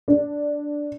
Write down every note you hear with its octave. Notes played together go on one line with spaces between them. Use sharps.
D4